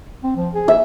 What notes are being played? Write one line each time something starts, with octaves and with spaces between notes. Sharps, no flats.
C4
F3
G#4
E5